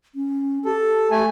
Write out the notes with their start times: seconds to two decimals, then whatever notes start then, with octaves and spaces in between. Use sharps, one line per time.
0.15 C#4
0.65 G4 A4
1.11 A3 G#5